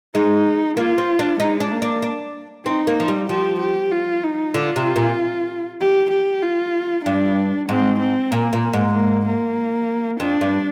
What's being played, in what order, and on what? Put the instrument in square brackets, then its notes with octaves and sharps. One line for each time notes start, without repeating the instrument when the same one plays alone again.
[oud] G#3 [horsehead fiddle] D#4
[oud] A#3 [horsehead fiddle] F4
[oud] C4
D4
[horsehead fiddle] G#3 [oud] D#4
[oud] D4
[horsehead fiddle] A#3
[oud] D4
D4
[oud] C4 [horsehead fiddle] D#4
[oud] A#3
F3
G3
[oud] F3 [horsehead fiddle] G4
[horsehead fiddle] G4
F4
D#4
[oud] D3 [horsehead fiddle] F4
[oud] C3
A#2
[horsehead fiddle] G4
G4
F4
[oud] G2 [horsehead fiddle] D4
[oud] G#2 [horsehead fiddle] C4
[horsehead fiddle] C4
[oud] A#2 [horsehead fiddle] A#3
[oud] A#2
G#2
[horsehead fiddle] A#3
A#3
[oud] F2 [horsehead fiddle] D4
[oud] G2